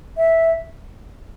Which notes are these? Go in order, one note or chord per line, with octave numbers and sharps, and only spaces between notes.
E5